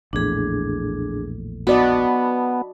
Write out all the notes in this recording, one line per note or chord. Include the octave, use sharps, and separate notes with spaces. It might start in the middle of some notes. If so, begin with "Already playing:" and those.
A#1 E2 A2 D4 G#4
B3 F#4 D5 D#5 A5 B5